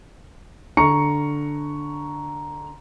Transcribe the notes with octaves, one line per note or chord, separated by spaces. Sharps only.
D3 A#5 C#6 C#7